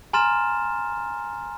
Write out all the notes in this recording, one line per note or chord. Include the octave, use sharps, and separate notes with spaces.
G#5 A#5 C6 F6 A6 E7